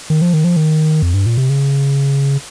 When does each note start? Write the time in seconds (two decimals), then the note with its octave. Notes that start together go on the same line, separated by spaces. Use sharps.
0.10 D#3
0.22 F3
0.33 D#3
0.44 F3
0.57 D#3
1.02 F2
1.14 G2
1.26 A#2
1.38 C3
1.50 C#3